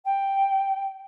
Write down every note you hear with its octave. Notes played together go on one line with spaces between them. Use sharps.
G5